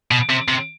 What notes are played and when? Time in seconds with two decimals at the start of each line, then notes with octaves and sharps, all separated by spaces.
0.11 B2
0.30 C3
0.48 C3